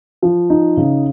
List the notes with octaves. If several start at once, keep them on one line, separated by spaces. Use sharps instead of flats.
F3
D#4
C#3